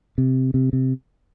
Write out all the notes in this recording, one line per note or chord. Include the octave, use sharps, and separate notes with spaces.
C3
C3
C3